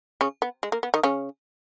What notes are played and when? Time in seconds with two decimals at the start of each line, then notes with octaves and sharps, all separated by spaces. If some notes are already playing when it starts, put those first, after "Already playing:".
0.21 C#3 C#4
0.42 B3
0.63 G#3
0.72 A#3
0.83 B3
0.94 D#3 D#4
1.03 C#3 C#4